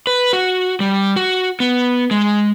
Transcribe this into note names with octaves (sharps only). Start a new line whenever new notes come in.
B4
F#4
G3
F#4
B3
G#3